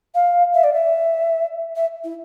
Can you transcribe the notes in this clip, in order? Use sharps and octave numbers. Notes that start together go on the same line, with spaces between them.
F5
E5
D5
E5
E5
E4